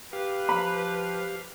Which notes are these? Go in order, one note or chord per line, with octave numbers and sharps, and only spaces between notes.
G4 B4 F5
F3 B5